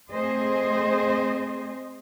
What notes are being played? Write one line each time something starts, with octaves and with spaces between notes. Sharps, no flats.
A3 C4 G#4 C5 D#5